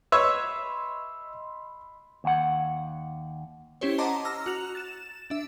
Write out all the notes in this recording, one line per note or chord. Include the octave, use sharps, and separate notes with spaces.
B4 C#5 D#5 E5 B5 C6 E6
D#2 F#5
C#4 E4 G4 C5 C#5
D#5 F#5 A5 A#5 C6 D6
A#5 E6 F6 A#6
F#4 F#6 F7
A6 E7
D4 E5